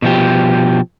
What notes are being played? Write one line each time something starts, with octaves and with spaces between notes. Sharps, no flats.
B2 F3 G4